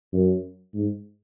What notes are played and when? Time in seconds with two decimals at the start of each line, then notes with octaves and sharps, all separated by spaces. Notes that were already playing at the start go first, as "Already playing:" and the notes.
0.13 F#2
0.75 G#2